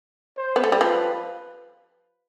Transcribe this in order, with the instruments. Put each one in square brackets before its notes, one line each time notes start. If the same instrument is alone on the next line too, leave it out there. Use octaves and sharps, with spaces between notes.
[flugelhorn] C5
[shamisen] B3
A3
G3
[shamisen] F3 [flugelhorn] B4